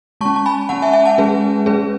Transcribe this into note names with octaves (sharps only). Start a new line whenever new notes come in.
G#3 C#4 A5 C#6
A5
G#5 B5
G#3 C#4 F#5 A5
E5 G#5
E5 G#5
F#5 A5
G#3 C#4 G#4 B4
G#3 C#4 G#4 B4